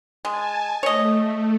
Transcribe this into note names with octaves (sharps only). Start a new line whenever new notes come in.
G#3 G#5 A5
A3 C#5 D#5